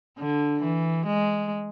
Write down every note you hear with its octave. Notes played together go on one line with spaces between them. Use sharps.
D3
E3
G#3